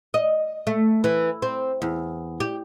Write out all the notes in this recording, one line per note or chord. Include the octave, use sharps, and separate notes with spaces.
D#5
A3
E3
C4
E2
G4